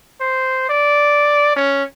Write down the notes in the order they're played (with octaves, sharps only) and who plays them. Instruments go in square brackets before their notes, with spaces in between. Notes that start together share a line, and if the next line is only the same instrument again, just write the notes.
[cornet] C5
D5
C#4